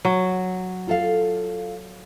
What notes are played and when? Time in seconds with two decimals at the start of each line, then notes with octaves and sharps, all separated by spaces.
0.05 F#3
0.87 F4 A4 F5